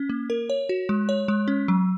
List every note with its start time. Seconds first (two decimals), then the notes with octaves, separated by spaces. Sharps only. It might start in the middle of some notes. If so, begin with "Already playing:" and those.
Already playing: C#4
0.10 A#3
0.30 A#4
0.50 C#5
0.69 F#4
0.89 G#3
1.09 C#5
1.28 G#3
1.48 C#4
1.68 F#3